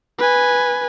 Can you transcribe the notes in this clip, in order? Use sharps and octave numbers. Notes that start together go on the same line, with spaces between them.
B4 G#5